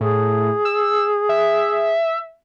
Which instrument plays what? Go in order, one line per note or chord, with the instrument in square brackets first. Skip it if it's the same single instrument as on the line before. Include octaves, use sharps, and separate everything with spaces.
[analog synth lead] A2 [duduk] G#4
[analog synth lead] E6
E5